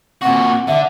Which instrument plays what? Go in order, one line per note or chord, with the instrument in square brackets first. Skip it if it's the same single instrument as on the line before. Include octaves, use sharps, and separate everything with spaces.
[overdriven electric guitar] A#2 F#4 [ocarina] C4
[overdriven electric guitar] D3 [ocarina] E5